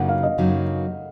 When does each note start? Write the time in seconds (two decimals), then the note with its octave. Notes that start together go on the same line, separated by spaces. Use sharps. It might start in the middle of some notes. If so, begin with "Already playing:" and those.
Already playing: F#2 C#3 F#3 A#3 D#4 F#5
0.09 F5
0.23 D#5
0.38 F#2 C#3 F#3 A#3 D#4